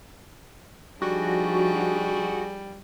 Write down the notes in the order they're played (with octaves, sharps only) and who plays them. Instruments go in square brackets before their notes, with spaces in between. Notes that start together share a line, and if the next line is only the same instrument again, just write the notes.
[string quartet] F3 D4 D#4 [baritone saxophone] G3 [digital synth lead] F#4 [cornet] G#4